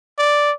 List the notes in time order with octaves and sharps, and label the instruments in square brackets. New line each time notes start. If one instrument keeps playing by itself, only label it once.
[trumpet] D5